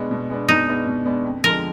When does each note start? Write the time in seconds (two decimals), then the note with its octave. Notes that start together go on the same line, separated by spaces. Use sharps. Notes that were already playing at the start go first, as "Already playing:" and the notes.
Already playing: B2 G#3 B3 D4
0.11 B2
0.30 G#3 B3 D4
0.48 B2 D#4
0.68 G#3 B3 D4
0.87 B2
1.05 G#3 B3 D4
1.24 F2
1.43 D3 F3 G#3 A#4